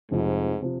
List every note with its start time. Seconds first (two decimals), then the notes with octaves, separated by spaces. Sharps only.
0.11 F1 F2 G#2 C3 F3
0.62 C3 F3